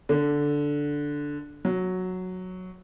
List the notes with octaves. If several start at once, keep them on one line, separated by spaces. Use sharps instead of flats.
D3
F#3